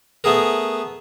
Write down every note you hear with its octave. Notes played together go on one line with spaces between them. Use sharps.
A3 B3 G#4 A#4